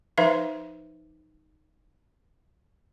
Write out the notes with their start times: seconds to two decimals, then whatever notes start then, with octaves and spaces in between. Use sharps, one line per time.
0.18 F3 D#4 B4 C5 E5 F5